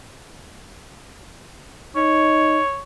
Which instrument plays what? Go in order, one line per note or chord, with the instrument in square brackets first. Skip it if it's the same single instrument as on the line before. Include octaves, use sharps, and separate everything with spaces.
[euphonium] D#4 [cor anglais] C#5